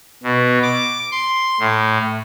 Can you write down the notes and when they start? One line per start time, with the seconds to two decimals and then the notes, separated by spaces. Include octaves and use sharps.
0.23 B2
0.63 D6
1.11 C6
1.60 A2